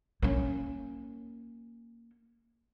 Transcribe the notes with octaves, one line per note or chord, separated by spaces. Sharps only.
A#3 C#4